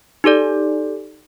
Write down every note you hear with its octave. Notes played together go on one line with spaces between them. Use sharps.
D#4 G4 A4 D5